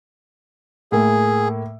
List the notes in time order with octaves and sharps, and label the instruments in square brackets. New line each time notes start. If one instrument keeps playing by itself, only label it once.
[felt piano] A2 A#3 [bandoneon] G#4